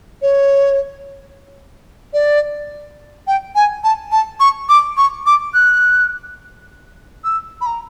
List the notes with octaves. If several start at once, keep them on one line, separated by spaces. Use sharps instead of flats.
C#5
D5
G5
G#5
A5
A5
C#6
D6
C#6
D6
F#6
E6
B5
A#5